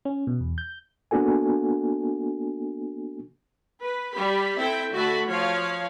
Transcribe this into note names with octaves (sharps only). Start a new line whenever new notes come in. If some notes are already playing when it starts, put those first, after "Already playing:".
C#4
B2
E2
G6
A#3 B3 D4 F#4 A4 G#5
B4
G3 G4 B5
C4 E4 A4 E5 G5
D3 A3 F#4 E5 A5 B5
F3 C#5 F5